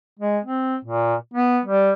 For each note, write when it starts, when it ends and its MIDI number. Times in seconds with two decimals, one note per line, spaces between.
0.19 0.38 56
0.44 0.75 60
0.85 1.15 46
1.34 1.60 59
1.65 1.92 55